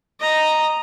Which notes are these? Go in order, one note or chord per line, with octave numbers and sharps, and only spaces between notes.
D#5 A#5